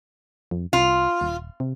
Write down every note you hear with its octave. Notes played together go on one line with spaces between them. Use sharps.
F2
C2 F4
D#1
C3